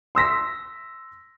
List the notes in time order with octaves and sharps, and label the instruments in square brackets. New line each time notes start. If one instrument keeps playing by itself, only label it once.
[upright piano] C6 E6 A#6 B6